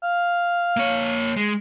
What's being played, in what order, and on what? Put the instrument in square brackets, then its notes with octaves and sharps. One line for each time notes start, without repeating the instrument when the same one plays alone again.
[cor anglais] F5
[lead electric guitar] A#3 C#5
G#3